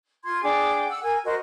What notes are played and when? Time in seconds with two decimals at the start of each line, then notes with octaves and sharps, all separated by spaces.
0.24 F4 C6 G#6
0.43 D4 G#4 G5 D6
0.88 F#5 E6
1.03 A#4 G#5
1.24 F#4 A#4 C5 D#5